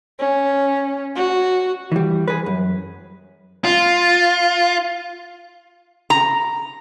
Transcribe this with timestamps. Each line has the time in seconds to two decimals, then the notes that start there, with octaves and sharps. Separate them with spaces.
0.19 C#4
1.16 F#4
1.92 E3 G3
2.28 G#4 B4
2.46 F#2
3.64 F4
6.10 A#5